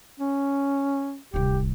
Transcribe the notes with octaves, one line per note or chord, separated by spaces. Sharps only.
C#4
D1 C2 G4